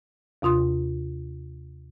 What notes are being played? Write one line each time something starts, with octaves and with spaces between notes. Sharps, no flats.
D#2 C3 F4 C6 D#6